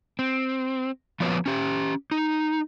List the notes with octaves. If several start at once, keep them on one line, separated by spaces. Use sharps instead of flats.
C4
F3 B3 C#4 F#4 B4 C#5
C#4 G4
D#4